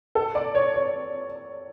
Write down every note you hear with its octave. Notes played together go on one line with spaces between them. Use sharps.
A4
D5
C#5
C#5